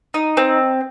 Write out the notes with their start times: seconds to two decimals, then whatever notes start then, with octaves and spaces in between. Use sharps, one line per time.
0.14 D#4
0.37 C4